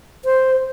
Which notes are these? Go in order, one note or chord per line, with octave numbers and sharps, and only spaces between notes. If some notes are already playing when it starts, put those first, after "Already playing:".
C5